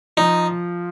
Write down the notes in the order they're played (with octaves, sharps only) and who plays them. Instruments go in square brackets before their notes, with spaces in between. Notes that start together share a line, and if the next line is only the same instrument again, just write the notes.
[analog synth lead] F3 [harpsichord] D#4